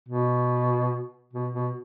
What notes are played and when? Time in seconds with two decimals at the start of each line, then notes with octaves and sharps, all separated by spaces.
0.09 B2
1.33 B2
1.53 B2